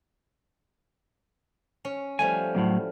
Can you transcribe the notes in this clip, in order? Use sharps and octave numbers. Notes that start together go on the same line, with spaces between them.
C#4
F3 G3 A3 G#5
A2 F#3 A#3